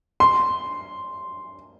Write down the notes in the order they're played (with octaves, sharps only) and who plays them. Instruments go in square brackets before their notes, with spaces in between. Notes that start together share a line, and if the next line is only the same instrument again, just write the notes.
[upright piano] C6